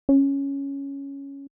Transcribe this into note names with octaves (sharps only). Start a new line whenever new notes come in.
C#4